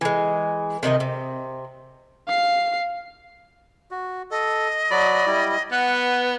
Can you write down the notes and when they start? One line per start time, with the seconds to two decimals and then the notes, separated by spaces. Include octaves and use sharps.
0.01 E3 G#3
0.83 C3 D#3 D#4 D#5
1.00 C3
2.27 F5 C7
3.91 F#4
4.31 A4 D#5
4.91 F#3 F#4 D5 B5
5.26 G3 E4
5.71 B3 B4 F#5